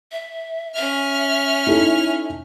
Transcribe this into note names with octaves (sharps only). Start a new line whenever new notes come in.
E5
C#4 E5 F6
D#4 E4 A4